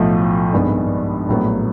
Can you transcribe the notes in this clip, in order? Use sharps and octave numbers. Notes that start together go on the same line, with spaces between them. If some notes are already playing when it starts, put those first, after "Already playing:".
Already playing: B1 A2 F3 A3
G#1 G2 D#3 G#3 B3
A#1 A2 F#3 B3